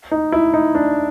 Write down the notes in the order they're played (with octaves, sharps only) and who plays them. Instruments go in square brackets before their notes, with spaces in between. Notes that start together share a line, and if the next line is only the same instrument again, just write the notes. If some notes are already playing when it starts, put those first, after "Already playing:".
[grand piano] D#4
E4
D#4
D4